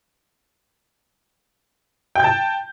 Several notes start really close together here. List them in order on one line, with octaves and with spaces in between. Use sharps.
G5 G6 A5